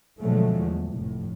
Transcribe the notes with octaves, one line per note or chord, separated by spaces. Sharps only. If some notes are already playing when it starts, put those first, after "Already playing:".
B2 D3 F3 F#3 G#3 A3
E2
F1 A2